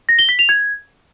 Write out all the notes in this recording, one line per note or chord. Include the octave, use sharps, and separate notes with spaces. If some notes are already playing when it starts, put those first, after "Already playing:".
A#6
G7
B6
F7
G#6